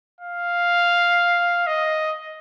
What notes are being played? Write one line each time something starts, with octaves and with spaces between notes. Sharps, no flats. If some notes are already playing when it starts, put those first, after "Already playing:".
F5
D#5